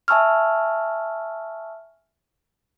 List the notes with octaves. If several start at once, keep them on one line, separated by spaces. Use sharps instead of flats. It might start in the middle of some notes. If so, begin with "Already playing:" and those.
E5 G#5 A5 C#6 E6 F6